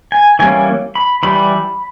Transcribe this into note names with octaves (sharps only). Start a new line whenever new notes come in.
G#5
E3 G3 A#3 C#4 G#5
B5
E3 G3 B5